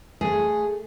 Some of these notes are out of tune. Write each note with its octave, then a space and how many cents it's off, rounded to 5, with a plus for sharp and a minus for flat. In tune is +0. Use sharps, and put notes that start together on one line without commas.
A3 +0 G#4 +0